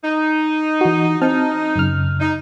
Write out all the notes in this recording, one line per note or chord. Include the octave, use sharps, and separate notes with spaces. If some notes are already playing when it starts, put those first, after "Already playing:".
D#4
E3 F#4
C4 D#4 A5 F6
F#2 C#3 F6
D#4